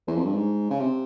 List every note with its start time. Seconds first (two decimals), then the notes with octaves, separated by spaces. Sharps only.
0.07 E2
0.15 F2
0.25 G2
0.34 G#2
0.70 C#3
0.80 C3